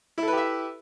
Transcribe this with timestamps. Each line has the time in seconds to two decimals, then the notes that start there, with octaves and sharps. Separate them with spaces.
0.18 E4
0.23 A4
0.27 B4
0.32 G4
0.37 E5